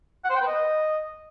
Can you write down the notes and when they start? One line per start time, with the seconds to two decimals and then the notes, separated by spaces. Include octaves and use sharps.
0.24 F#5
0.30 C5
0.35 G5
0.41 B4
0.47 D#5